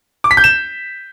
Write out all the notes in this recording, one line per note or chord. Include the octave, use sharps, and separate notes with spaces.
D6
B6
G6
E7